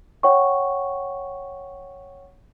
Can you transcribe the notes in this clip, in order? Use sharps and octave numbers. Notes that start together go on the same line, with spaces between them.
C#5 F#5 G5 C#6